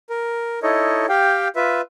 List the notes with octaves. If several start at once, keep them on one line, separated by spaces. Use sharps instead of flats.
A#4
D#4 E4 A4 C#5 D#5
G4 F5 G5
F4 B4 E5